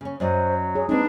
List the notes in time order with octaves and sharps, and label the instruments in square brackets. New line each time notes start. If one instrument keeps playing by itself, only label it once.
[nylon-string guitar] C#3 C#4
[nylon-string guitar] F#2 D5 D#5 [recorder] F#3 [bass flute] C5
[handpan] G#4 [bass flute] C#5
[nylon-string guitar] G#3 A#3 [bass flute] C4 [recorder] D4 [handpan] D#4 B4